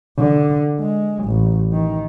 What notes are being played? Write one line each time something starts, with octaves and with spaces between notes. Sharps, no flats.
D3
G#3
A1
D#3